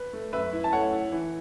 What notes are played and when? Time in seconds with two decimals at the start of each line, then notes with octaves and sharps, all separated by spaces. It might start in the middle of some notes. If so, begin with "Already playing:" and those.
Already playing: B4
0.13 A3
0.33 F#2 B4 E5
0.53 E4
0.64 A5
0.73 A3 C#5 F#5
0.93 E4
1.12 E3